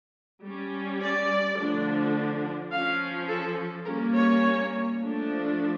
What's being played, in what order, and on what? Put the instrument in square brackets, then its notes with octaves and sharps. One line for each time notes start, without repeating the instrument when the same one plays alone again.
[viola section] G3 C#4
D5
D3 F3 A3 D4
F3 C#4 F5
A4
G3 A#3 C#4 A#4
C#5
F3 A3 D4